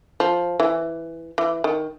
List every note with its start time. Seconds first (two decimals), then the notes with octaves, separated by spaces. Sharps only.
0.20 F3
0.60 E3
1.38 E3
1.64 D#3